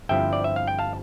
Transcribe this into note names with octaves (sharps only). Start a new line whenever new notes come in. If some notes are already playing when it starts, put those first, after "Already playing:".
G1 G2 F3 C4 E4 E5 G5
D5
E5
F5
G5
F5 A5